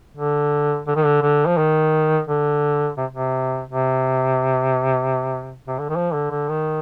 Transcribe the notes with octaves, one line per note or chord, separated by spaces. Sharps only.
D3
D3
D#3
D3
D3
F3
D#3
D3
C3
C3
C3
C3
D3
D#3
F3
D3
D3
D#3